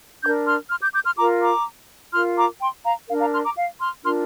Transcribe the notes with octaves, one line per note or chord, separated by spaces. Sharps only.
D4 A#4 D6 G6
C6 F6
C6 F6
D6 G6
D6 G6
C6 F6
F4 A#4 A#5 D6
A#5 D6
F4 A#4 C6 F6
A#5 D6
G5 C6
F5 A#5
D4 A#4 F5
F5 A#5
C6 F6
A#5 D6
F5
C6 F6
D4 F4 A#4 C6 F6